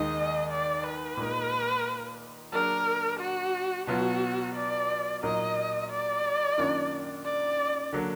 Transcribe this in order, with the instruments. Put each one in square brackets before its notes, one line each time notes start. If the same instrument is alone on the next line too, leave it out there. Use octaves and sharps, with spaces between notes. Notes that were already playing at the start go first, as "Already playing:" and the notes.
Already playing: [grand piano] D#2 D#3 G#3 D#4 [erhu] D#5
[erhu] D5
B4
[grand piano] A#2 G#3 D#4
[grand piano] F#3 A#3 D4 G#4 [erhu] A#4
[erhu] F#4
[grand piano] B2 F#3 B3 F4 [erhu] F#4
[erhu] D5
[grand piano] A#2 F#3 A#3 D#4 A#4 [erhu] D#5
[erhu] D5
[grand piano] F#2 D#3 A#3 D4 F4
[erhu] D5
[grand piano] D3 F#3 A#3